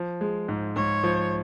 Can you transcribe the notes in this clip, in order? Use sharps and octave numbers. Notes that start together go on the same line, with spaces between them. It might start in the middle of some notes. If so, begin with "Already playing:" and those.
Already playing: F3
G#3
G#2
G#2 C#5
F3